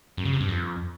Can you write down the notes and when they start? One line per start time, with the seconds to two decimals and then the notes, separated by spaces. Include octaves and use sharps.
0.17 F#2
0.25 C#3
0.33 C3
0.41 G2
0.48 F2